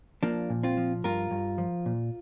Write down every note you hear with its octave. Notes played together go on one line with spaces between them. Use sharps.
F3 A#3 D4
A#2
C4 F4
F3
G2 F4 A#4
G2
F3
A#2